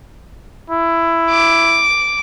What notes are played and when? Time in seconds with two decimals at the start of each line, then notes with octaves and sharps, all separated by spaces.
0.70 E4
1.30 D6